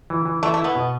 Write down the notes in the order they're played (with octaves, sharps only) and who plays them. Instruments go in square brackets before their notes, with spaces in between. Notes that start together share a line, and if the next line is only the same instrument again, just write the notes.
[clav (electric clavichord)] E3
E3
[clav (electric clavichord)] E3 [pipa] A3
[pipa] A3
[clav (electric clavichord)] E4
[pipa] B3
[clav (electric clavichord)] B2